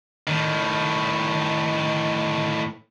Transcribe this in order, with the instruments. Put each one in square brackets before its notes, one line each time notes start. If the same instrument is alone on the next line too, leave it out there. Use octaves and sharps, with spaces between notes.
[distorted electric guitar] A2 D#3